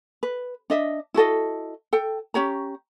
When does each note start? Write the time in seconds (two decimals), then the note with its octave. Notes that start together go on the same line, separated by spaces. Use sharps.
0.23 B4
0.70 D4 D#5 E5
1.14 E4 F#4 A4 D#5
1.93 A4 G5
2.34 C#4 G4 C#5 A#5